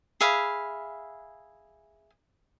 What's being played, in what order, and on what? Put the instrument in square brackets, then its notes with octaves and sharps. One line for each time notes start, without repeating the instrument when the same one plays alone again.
[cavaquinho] G#4 E5 F5 B5